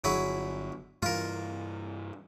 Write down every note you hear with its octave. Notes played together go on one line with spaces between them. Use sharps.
G1 F#3 E4 G#4
G2 E3 F4 A#4